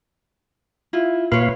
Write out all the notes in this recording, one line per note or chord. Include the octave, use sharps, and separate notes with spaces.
E4 F4
A#2 B4 C#5 F5 C6